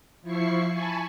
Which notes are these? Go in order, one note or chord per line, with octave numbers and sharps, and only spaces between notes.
F3 E4 C#6 C7
G#5 A5 B5 C#6